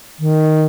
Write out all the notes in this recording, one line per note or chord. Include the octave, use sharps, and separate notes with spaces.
D#3